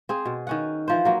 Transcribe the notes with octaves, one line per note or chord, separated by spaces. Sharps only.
C4 G#4
B2
D#3 C#4 F#5
E3 F3 C5
F#3 A#3